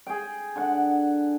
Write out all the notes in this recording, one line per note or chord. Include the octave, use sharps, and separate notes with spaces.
G#4 G5
D3 F#5